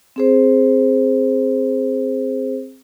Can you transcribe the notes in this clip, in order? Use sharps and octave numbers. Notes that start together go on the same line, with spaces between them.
C4 G#4 C5